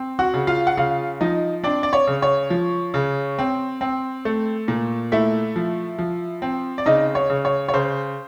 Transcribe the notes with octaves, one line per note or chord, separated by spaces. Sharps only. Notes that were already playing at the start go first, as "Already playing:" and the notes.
Already playing: C4
F#4 F#5
C#3
F4 F5
F#5
C#3 F4 F5
F3 D#4 D#5
C4 D4 D5
D5
C#5
C#3
C#5
F3
C#3
C4
C4
A3
A#2
A3 E4 E5
F3
F3
C4
D5
C#3 D#4 D#5
C#5
C#3
C#5
C#5
C#3 C5